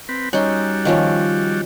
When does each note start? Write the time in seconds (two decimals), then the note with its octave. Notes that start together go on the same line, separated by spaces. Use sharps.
0.09 C4 B4
0.33 G3 C#4 D#4 F#4 C6
0.85 D#3 F3 C#4